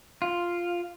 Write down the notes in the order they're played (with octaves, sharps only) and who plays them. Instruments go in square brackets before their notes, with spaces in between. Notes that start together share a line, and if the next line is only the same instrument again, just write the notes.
[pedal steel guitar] F4